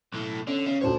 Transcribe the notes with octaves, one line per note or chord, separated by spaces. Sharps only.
B1 A2
D3 C#4
C#3 C#4
D2 A#2 C5 C#5 A5